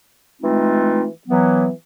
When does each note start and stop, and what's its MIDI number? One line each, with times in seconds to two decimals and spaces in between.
0.42 1.07 52
0.42 1.07 56
0.42 1.07 57
0.42 1.07 60
0.42 1.07 63
0.42 1.07 65
1.28 1.70 52
1.28 1.70 54
1.28 1.70 59